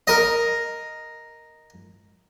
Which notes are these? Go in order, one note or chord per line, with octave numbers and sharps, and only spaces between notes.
A#4 D#5